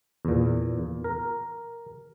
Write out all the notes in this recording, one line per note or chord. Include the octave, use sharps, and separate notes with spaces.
E2 A#2
A#4